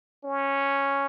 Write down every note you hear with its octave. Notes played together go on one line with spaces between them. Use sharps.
C#4